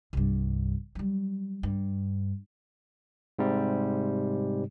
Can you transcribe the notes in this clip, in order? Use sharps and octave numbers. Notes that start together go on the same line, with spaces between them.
C2 G2
F#3 G3
G2
G#2 C3 G3